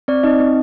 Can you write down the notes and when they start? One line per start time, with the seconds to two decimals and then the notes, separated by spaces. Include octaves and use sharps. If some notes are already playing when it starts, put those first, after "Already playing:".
0.08 C4 D5
0.23 C4 D#4 D#5
0.40 C4